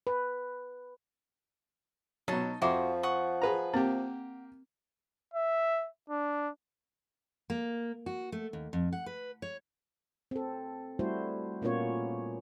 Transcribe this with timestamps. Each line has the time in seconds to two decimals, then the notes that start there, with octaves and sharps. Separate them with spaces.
0.07 B4
2.28 B2 F#3 D#4 A5
2.62 F2 F3 F#4 E5 C6 D6
3.03 F#5 C#6 D#6
3.42 G#4 B4 A#5
3.74 A#3 C4 G4
5.34 E5
6.10 D4
7.50 A#3
8.06 F#4
8.32 A3
8.53 D#2
8.73 F2
8.93 F#5
9.06 B4
9.42 C#5
10.31 C4 A4
10.99 G3 A3 E4 F#4 C5
11.62 A#2 A#3 B3 C#4 F4 C#5